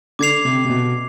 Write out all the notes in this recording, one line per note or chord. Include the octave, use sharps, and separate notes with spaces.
D3 D6 G#6 C7 F7
C3
C3
B2